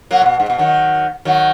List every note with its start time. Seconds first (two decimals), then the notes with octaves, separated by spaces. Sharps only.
0.11 F#3 A#3
0.22 A#2
0.26 B2
0.40 G#2
0.50 B2
0.58 D#3 F#3
1.25 D#3 F#3